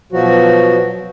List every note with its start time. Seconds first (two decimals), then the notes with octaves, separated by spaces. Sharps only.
0.12 B2 F3 F#3 F#4